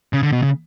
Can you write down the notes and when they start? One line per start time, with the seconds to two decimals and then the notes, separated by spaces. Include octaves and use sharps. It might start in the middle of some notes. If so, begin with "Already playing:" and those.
0.13 C#3
0.23 D3
0.32 B2
0.43 C#3